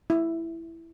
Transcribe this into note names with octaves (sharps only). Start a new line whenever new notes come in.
E4